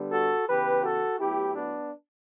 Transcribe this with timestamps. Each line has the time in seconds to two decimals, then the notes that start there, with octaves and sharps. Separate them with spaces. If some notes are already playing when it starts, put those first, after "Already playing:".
Already playing: D3 G3 B3
0.12 F#4 A4
0.48 C#3 E3 B3 G4 B4
0.83 F#4 A4
1.19 A2 F#3 B3 E4 G4
1.55 B3 D4